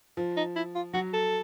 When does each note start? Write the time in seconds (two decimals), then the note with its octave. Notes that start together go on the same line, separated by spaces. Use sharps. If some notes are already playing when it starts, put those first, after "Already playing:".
0.17 F3
0.37 D#4
0.56 E4
0.75 F4
0.93 F#3 F#4
1.14 A4